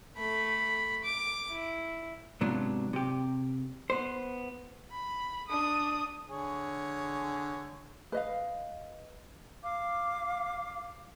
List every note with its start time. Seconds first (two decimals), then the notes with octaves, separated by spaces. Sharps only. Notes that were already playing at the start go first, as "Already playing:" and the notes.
0.17 A3 B5
1.04 D6
1.49 E4
2.41 G#2 C3 F#3 B3 D4 F4
2.93 C3 G4
3.90 B3 C5
4.92 B5
5.48 D4 D#6
6.29 D3 G#4 C#5
8.12 B4 D#5 F5
9.63 F5 D6